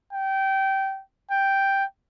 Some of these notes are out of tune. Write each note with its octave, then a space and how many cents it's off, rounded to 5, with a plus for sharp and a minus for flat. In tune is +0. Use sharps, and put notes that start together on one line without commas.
G5 -20
G5 +0